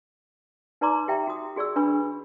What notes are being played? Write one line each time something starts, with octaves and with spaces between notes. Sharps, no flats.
D#4 B4 D5 A#5 C6 D6
G4 E5 G5 A#5
F#4 D#6
F#4 G#4 D5 C#6 E6
D4 B4 B5 C#6